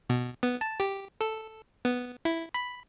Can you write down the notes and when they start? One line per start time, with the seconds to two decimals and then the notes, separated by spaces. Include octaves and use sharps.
0.09 B2
0.43 B3
0.61 A5
0.80 G4
1.21 A4
1.85 B3
2.25 E4
2.54 B5